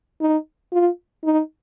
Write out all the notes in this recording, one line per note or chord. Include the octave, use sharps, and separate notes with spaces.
D#4
F4
D#4